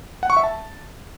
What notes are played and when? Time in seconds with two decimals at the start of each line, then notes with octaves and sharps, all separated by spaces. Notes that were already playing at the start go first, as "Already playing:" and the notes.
0.23 F#5
0.30 C#6
0.37 E5
0.43 A5